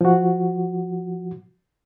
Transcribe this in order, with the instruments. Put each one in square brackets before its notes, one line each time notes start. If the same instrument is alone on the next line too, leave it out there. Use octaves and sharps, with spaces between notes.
[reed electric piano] F3 F#4